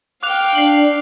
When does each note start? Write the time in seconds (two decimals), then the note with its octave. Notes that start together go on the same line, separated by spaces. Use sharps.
0.23 F5 G5 D6 F#6 F7
0.55 D4 C7 F#7